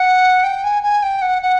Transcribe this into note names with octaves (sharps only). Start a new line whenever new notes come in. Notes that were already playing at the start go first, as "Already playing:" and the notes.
Already playing: F#5
G5
G#5
G#5
G5
F#5
F#5